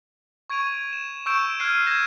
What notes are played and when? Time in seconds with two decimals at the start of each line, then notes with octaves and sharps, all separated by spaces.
0.50 C#6 G#6 D7 D#7 F7
0.93 E7
1.26 C#6 E6 G6 D7 E7
1.59 F6 F#6 G#6 C7 D#7
1.87 G6 G#6 A#6 E7